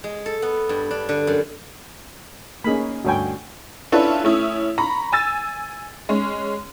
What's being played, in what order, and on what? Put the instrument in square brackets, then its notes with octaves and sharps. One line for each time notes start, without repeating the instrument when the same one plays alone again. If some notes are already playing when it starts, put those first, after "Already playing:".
[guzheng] G#3
A4
B3
G2
D4
D3
F#2
[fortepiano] A#3 G#4 [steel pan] C#4 D#4 B5
[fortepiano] D2 G2 G#5 [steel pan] F#4 C#5 G5
[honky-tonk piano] C#4 D4 E4 F4 A4 B4
A3 C#4 E4 D#6
A#5 B5 C#6
G#5 E6 A6
G#3 C#4